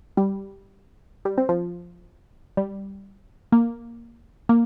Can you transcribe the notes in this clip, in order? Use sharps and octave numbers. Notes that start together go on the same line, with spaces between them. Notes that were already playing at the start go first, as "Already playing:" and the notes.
G3
G3
C4
F3
G3
A#3
A#3